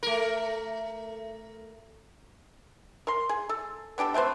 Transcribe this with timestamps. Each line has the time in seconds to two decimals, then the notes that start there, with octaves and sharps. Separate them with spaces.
0.03 A3 A#4
3.07 A#4 C6
3.29 G#4
3.49 A4
3.98 B3 D4 G4 A4
4.14 A3 C4 B4 C5